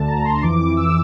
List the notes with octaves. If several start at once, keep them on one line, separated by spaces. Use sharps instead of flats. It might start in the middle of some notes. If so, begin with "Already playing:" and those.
Already playing: D2 D3 A5
A#5
C6
F2 E3 D6
E6